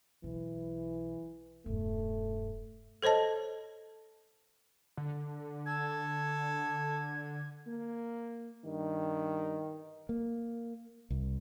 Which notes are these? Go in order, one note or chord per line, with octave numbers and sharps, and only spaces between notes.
B1 E3
E1 G2 A3
A4 C5 C#5 D#5 A5
D3
A4 G#6
A#3
G2 D#3
A#3
C2